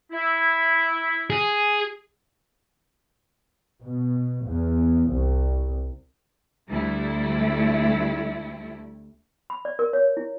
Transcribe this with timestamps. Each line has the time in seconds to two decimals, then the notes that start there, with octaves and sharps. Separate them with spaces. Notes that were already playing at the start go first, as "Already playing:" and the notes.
0.12 E4
1.30 G#4
3.83 B2
4.46 E2
5.12 C2
6.70 D2 G3 A3 E4
9.50 B5
9.65 D5
9.79 A#4
9.93 C#5
10.17 E4